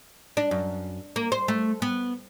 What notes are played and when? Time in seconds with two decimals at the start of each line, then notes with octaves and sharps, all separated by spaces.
0.37 D4
0.51 F#2
1.16 A#3
1.32 C5
1.48 A3
1.82 B3